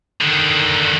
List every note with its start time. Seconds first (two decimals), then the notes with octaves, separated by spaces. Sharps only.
0.21 D3 D#3